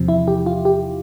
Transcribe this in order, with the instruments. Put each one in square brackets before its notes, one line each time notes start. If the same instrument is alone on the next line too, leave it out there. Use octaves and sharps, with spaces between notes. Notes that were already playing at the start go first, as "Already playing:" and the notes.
Already playing: [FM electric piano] E2 C3 F3
E4
G4
F4
G4